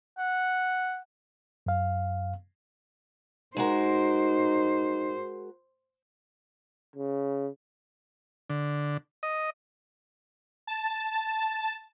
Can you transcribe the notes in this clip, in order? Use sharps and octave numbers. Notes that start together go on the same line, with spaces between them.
F#5
F#2 F5
G#3 D#4 F#4 A#4 C5
C#3
D3
D#5
A5